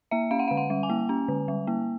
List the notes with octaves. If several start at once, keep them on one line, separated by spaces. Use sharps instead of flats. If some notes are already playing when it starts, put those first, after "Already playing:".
A#3 E5
C#4 F5
F#5
D3 F5
F#5
G3
G#5
A#3
C#4
D3
G3
A#3